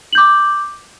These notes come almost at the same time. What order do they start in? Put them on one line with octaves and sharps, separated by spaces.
F#7 G6 D6